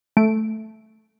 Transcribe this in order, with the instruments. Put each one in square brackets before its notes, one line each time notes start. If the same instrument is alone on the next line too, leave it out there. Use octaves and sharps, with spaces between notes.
[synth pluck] A3 D7